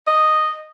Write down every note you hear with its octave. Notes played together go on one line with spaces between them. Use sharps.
D#5